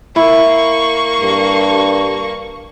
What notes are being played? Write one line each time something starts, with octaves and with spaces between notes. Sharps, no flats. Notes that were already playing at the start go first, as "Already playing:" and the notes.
A#3 E4 C#6
G2